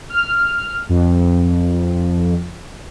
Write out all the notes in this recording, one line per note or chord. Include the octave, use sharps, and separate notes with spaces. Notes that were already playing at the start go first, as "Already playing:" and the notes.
F6
F2